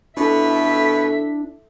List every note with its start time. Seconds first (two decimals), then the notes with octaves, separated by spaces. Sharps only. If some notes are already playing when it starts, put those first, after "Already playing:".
0.17 B2 D4 E4 A4 E5 B6